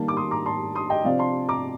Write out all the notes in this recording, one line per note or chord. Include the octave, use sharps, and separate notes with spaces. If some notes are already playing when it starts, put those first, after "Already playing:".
Already playing: D#3 G3 A#3 A5
D6
C6 D#6
A#5 D6
A5 C6
C6 D#6
D#5 G5
C3 F3 C4 D5 F5
A5 C6
A#5 D6